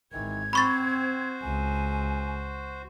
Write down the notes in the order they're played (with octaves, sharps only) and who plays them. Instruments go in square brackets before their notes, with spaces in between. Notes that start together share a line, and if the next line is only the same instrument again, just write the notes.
[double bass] G#1 [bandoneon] D#3 E3 [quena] G#6
[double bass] C4 [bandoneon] F#4 C5 [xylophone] B5 C#6 A6
[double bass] C#2 [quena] G#5